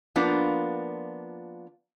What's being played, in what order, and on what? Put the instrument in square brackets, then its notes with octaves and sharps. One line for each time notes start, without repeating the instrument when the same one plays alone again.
[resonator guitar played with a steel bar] F3 A#3 B3 D4 F4